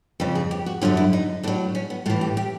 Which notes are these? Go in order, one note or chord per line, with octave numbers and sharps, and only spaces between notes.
F2 C#3 F3
G#4
G4
F#4
F#2 D3 F#3 F4
E4
D#4
A2 F#3 D4
C#4
B3
A2 E3 F4
G4
G4